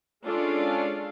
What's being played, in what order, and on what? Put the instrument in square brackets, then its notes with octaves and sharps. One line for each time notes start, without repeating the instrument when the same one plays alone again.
[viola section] G#3 C#4 D4 F4 A4 F5